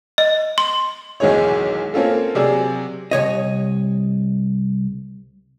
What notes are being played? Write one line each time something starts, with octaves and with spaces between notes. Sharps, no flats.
D#5
C6
B1 E2 D#3 G#3 G#4 C#5
A#3 C4 C#4 F4 A4
C3 F#3 G#4 D5 E6
C2 A#2 C#5 D#5